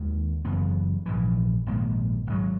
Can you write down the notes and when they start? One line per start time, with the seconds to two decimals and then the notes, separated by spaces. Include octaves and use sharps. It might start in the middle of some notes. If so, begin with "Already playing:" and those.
Already playing: D#2 D#3 G#3
0.45 F#1 F#2 E3 B3
1.06 A#1 G#2 E3
1.66 A#1 G#2 D#3 A#3
2.27 G#1 G#2 F#3